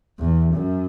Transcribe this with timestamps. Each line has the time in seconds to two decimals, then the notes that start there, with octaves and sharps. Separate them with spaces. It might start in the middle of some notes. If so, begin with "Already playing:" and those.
0.19 E2
0.55 F#2